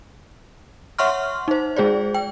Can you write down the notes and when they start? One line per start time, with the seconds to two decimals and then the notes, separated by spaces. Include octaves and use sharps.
0.99 C#5 E5 F#5 C6 C#6 F6
1.48 D#4 C5
1.76 G#3 G#4 C5 D5
2.14 G5